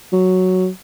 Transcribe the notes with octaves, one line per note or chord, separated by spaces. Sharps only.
F#3